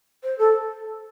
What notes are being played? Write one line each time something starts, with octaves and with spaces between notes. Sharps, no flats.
C5
A4